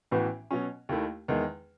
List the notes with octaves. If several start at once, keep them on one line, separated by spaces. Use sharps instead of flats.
A1 A2 E3 B3 F#4
B2 F#3 C#4
D#2 D#3 A3 E4
E2 D#3 G#3